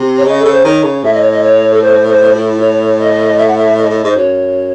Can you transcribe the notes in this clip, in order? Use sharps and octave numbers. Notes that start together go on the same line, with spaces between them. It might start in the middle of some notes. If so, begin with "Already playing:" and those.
Already playing: C3
C#5
C#3 D#5
A4
C#3
C5
D#3 C#5
C#3
A2 E5
D#5
C#5
D#5
C#5
A4
C5
C5
E4
C#5
D#5
E5
F#5
E5
D#5
A2
G#2 C5
F#2 C#5